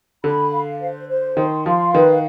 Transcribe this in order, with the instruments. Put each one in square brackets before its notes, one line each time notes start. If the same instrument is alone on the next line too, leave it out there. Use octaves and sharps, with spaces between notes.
[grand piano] D3 [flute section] B5
[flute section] F5
C5
C5
[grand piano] D#3 [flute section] C6
[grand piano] F3 [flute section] F5
[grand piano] D#3 [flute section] B4